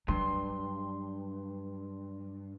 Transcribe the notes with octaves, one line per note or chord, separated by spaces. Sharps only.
G2 F#3 C6